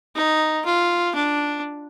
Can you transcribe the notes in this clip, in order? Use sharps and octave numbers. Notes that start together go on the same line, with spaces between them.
D#4
F4
D4